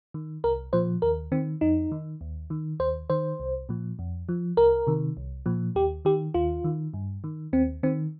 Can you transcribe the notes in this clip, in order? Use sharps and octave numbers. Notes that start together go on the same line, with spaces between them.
D#3
C2 A#4
A#2 F3 C5
D#2 A#4
D#3 C4
F2 D#4
D#3
D#2
D#3
D#2 C5
D#3 C5
C2
A#2 F3
F2
F3
C2 A#4
C3 D#3
C2
A#2 F3
D#2 G4
D#3 G4
D#2 F4
D#3
G2
D#3
D#2 C4
D#3 C4